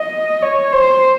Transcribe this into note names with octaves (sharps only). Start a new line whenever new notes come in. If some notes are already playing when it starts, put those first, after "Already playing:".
Already playing: D#5
C#5
C5